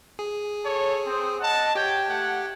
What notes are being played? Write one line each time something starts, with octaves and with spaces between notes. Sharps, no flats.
G#4
A4 C#5
C4 D#6
D#5 F#5 A5
G4 C#5 G5 G#6
A3 F#5